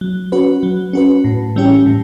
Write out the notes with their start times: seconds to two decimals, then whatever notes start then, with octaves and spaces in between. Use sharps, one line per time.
0.01 F#3
0.32 C#4 F#4 B4
0.63 F#3
0.93 C#4 F#4 B4
1.24 A2
1.56 E3 G3 C#4 G4
1.86 A2